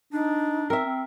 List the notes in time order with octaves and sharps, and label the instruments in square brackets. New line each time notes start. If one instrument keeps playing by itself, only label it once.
[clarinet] D4 [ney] D#4
[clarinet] C4 [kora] A#4 E5
[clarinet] C4